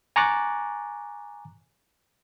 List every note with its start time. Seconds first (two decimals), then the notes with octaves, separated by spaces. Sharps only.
0.16 G#5 A#5 C#6 D6 F#6 A6